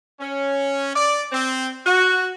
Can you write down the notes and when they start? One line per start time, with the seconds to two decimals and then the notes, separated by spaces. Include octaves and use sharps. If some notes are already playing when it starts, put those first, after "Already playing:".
0.20 C#4
0.95 D5
1.32 C4
1.86 F#4